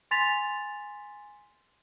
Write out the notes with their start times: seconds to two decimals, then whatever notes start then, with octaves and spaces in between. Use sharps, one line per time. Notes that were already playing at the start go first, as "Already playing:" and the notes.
0.11 G#5 C6 A6 B6 F7